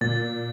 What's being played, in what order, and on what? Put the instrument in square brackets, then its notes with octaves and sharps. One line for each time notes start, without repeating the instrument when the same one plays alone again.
[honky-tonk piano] A#2 [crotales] A6